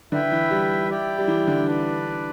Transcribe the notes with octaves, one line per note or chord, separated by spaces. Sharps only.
D3 E4 B4 E5 G5
E3
G3
E4 G4 D5 G5
G3
E3
D3
D4 B4 D5